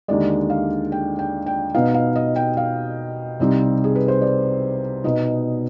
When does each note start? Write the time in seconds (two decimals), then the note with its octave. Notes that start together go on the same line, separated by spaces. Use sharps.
0.08 D#2 D3 G#3 D5
0.50 F5
0.92 G5
1.19 G5
1.46 G5
1.74 B2 B3 D#4 F5
1.94 F5
2.16 D#5
2.36 G5
2.57 F5
3.40 C2 C3 G3 C4 D#4
3.84 G#4
3.95 B4
4.08 C5
4.22 D5
5.04 B2 B3 D#4 D#5